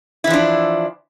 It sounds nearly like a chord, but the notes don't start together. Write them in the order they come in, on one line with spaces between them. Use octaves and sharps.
E4 E3 F3 D4